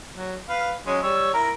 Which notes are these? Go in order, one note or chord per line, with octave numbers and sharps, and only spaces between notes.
F#3
B4 F5
F#3 G#3 C#4
G3 C#5 E6
E4 A#4